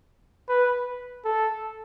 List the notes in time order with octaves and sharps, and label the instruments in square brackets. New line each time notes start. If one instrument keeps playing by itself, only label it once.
[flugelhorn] B4
A4